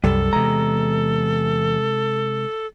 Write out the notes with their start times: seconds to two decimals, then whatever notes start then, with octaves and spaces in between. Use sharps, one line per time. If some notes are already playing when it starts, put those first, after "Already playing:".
0.04 C2 F#2 G3 A4
0.33 E2 G2 C3 G#3 A#5